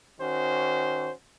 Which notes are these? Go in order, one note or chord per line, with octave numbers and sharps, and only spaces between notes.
D#3 C#4 F#4 C5